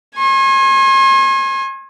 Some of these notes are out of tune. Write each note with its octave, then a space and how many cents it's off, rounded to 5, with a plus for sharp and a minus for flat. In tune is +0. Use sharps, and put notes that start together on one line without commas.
G#5 +0 C6 +45